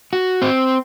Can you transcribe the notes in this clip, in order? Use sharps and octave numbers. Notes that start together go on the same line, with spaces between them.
F#4
C4